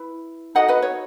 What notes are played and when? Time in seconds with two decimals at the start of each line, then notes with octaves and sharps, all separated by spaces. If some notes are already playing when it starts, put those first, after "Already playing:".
Already playing: E4 B4
0.55 D#4 F#4 A4 D#5 F#5
0.68 B4 D#5
0.82 C#5